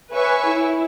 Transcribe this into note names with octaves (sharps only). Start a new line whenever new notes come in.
B4 C#5 E5 G#5 C#6
E4